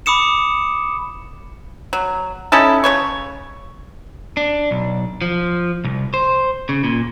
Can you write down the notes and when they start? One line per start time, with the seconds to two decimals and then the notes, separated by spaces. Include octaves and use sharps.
0.06 B5 D6 D#6 C#7 E7
1.93 F#3
2.52 C#4 D#4 E4 A4
2.84 C#3 C#5 C#6
4.37 D4
4.71 B1
5.21 F3
5.84 C2
6.14 C5
6.69 C#3
6.84 A#2